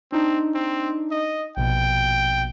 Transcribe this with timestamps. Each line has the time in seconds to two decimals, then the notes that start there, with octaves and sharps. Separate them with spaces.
0.12 C4 D4 D#4
0.55 C4
1.11 D#5
1.57 A#1 B2 G5